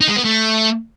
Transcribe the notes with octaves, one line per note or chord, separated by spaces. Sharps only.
D#4
G#3
B3
A3